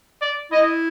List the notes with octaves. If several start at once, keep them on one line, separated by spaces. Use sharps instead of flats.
D5
E4 D#5